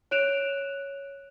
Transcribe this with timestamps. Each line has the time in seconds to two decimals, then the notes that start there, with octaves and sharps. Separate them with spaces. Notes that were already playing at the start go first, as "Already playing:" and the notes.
0.11 C#5 F#6 D7 E7 F7